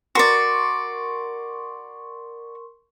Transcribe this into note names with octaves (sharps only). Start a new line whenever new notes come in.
F#4 A#4 D5 C6 C#6